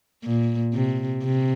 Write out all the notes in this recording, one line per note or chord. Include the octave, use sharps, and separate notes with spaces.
A#2
C3
C3